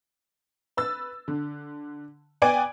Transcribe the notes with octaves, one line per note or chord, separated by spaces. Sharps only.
B4 E6 A6
D3
B3 D5 G5 G#5 G#6 D7